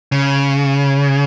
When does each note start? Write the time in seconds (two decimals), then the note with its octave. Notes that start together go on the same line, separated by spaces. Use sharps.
0.12 C#3